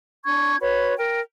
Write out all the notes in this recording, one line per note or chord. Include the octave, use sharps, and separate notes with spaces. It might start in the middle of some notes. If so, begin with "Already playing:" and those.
D4 C#6 G#6
F#4 B4 C#5 B5
A#4 G5